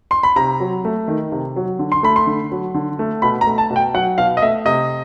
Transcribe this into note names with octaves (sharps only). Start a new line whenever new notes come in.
C6
B5
C3 A#5
F#3
A3
D#3
C3
F#3
D3
C6
A3 B5
C6
D3
F#3
D3
A3
B2 B5
A#5
A3
A5
B2
G5
F#3 F#5
B2 F5
D#5
A3 E5
C3 D#5